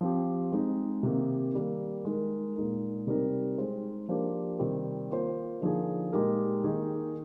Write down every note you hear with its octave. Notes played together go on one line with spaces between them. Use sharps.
F3 C4 G4
G#3 C4 D#4
C3 D#3 A#3
D#3 G3 A#3
G#3 D#4 A#4
A#2 G#3 D#4 A#4
C3 G3 C4 D#4 A#4
G#3 D#4 G#4 C5
F3 A#3 D4 G4 C5
C3 D#3 G3 C4
A#3 F4 C5
D3 F3 A#3 D#4 G#4
A#2 G#3 D#4 G4 A#4
D#3 A#3 D#4 G#4